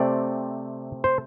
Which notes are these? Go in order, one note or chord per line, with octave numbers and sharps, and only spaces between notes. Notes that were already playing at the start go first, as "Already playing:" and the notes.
Already playing: C3 A3 C4 D5
C5